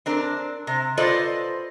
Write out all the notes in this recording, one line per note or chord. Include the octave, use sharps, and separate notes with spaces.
C4 D4 A#4
C3
F4 A4 B4 C5 D5 D#5